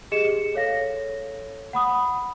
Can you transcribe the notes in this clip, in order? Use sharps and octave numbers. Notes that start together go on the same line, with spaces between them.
G4 G#4 D#5 C#7 E7
A4 C#5 F5 A#6
F#5 B5 D#6